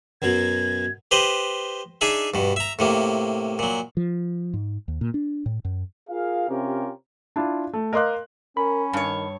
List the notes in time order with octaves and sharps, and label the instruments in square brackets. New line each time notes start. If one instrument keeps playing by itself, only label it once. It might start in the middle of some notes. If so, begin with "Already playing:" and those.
[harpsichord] F#2 B2 F#3 [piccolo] G#6
[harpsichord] G4 B4 C5 D#5
D4 D#4 G#4 E5
G2 B2
E5 A#5
A2 C3 A#3
A#2 F#3
[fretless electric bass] F3
G#2
D#2
A#2
D4
A2
F#2
[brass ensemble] F4 G#4 A#4 F5
C3 C4 C#4 F4 G4 A#4
[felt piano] D4 E4 F4
A3
A#4 D#5 F5 C6 D6 F#6
[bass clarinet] C#4 [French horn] A#4 [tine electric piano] B5
[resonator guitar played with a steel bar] G2 C#5 [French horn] D#3